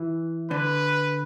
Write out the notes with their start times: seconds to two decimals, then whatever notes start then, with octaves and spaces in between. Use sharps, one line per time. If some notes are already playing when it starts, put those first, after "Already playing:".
Already playing: E3
0.51 D3 B4